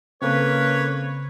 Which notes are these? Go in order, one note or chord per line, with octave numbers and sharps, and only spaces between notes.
C#3 A#3 C4 C#4 A4 B4 C#5